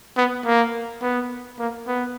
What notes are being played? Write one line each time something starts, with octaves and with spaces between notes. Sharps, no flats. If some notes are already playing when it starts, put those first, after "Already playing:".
B3
A#3
B3
A#3
B3